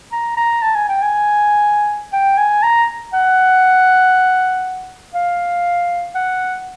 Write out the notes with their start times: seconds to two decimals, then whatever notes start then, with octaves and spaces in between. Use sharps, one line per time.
0.12 A#5
0.37 A#5
0.62 A5
0.75 G#5
0.89 G5
1.02 G#5
2.13 G5
2.37 G#5
2.63 A#5
3.13 F#5
5.14 F5
6.15 F#5